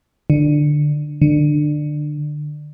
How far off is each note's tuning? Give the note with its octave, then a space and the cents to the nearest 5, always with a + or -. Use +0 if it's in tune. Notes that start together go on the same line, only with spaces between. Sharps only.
D3 +15
D3 +25